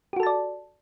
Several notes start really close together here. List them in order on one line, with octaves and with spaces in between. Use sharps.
G4 F#4 A4 A5 D5